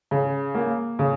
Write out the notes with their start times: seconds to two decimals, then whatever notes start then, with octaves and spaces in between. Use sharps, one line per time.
0.11 C#3
0.55 A#3
0.99 C#3